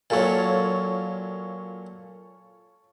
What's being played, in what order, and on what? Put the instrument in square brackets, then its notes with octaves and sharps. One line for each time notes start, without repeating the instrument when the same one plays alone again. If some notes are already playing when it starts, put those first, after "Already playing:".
[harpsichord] A#2 F#3 [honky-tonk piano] F4 A4 C#5